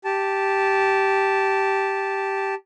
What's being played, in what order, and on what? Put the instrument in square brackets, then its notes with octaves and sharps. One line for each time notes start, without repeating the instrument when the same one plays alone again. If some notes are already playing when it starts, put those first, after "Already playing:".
[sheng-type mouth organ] G4 A5